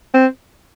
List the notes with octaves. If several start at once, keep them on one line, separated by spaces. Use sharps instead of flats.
C4